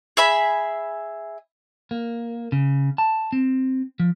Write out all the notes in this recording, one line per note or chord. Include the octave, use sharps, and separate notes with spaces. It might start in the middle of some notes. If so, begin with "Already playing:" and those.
G#4 E5 B5
A#3
C#3
A5
C4
F3